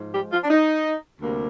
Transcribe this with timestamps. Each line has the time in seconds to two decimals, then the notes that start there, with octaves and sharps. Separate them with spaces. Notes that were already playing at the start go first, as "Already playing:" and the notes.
Already playing: G#2 F3 G#3
0.14 G3 G4
0.32 F3 F4
0.44 D4
0.50 D#4
1.22 D2 C3 G3 A#3